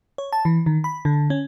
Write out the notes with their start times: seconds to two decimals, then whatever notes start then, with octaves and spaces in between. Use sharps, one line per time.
0.18 C#5
0.33 A5
0.45 E3
0.66 D#3
0.84 B5
1.05 D3
1.30 C#4